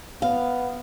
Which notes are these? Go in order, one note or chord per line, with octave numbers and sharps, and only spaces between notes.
B3 F5